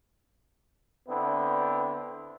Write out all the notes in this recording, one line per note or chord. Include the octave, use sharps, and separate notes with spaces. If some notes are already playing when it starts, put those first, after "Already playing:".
D3 B3 C4 E4